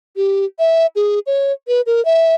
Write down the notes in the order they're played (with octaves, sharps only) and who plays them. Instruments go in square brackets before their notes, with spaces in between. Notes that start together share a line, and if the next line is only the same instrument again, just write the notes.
[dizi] G4
E5
G#4
C#5
B4
A#4
E5